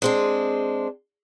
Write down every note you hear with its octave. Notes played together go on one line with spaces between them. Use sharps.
G#3 C4 D4